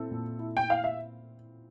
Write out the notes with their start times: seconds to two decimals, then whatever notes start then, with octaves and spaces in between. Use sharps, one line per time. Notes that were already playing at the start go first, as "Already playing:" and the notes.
Already playing: A#2 C4 E4 A4
0.11 A#2
0.39 E4
0.57 G5
0.68 E4 F5
0.84 E5